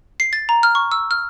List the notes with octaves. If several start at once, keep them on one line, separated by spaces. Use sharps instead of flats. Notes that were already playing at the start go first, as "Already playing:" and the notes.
C7
A6
A#5
F6
C#6
E6
F6